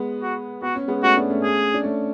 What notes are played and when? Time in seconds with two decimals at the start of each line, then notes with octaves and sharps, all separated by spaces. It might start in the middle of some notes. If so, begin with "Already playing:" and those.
Already playing: G#3 B3
0.22 F#4
0.62 B3 F#4
0.75 C#4
0.88 G#3 B3
1.03 A3 C#4 F#4
1.17 B3 D4
1.30 A3 C#4
1.43 G#4
1.74 D4
1.83 A3 C#4